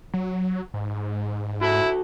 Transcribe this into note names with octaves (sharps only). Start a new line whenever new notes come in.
F#3
G#2
E4 F#4 A4